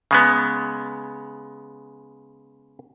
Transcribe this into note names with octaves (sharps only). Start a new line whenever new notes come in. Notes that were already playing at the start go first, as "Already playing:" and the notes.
C#3 G#3 B3